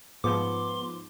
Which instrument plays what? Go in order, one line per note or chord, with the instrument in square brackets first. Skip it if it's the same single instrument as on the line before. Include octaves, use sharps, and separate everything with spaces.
[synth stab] G#2 F3 [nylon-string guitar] B3 [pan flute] C6 [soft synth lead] D6